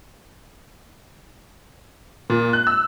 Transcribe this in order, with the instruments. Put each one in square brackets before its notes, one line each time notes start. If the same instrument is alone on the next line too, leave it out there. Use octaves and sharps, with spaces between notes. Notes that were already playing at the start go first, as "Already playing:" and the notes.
[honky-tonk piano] A#2
F#6
E6